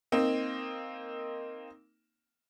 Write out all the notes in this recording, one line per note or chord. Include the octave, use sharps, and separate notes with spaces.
A#3 C4 D#4